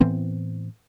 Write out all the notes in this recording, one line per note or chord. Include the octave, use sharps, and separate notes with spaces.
A2 E3 B3 C4